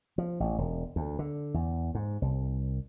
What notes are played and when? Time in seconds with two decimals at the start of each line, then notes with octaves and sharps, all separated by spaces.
0.18 F3
0.40 A1
0.58 E1
0.96 D2
1.19 D3
1.54 E2
1.95 G#2
2.22 C2